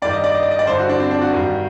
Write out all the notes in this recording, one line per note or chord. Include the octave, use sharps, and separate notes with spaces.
G2 D#3 D5
D#5
D5
D#5
D5
D#5
D5
G2 D3 C5
F#4
D4
C4
D4
F#4
G2 D#3